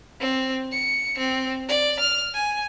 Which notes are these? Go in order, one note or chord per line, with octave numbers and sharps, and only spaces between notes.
C4
C#7
C4
D5
F6
G#5